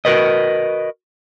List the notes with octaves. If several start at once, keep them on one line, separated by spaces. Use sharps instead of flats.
F#4 A#4 B4 D#5